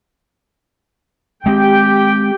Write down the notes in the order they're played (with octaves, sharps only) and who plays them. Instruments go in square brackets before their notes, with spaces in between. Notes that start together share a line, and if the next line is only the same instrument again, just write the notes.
[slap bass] G#3 C4 [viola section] G4 G5